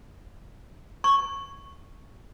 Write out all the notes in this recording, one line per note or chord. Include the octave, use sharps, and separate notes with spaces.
C#6